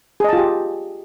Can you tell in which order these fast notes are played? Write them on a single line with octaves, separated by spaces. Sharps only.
G#4 D#5 A5 F4 G4